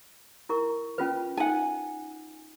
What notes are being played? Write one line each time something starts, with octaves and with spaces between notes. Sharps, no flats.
E4 A#4 C#6
C#4 F4 B4
D#4 F#5 G#5